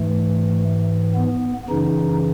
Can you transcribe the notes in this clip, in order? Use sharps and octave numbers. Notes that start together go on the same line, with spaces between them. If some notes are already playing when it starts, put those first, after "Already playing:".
Already playing: G#2 E3 A3
B3
F#2 C#3 E3 D#4